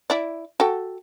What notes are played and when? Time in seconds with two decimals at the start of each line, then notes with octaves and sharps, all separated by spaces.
0.10 E4 D5
0.60 F#4 A4 G5